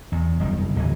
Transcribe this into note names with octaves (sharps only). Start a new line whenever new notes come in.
E2
F#1 C2 D#3
D1 D#2 E3